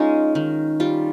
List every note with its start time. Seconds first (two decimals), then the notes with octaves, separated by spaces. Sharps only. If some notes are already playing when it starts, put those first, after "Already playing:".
Already playing: G#3 C#4 D#4 F4
0.35 D#3
0.80 G3 F4